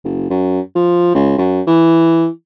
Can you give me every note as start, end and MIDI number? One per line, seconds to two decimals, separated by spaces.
0.04 0.27 30
0.30 0.60 42
0.75 1.14 53
1.15 1.33 37
1.38 1.61 42
1.67 2.27 52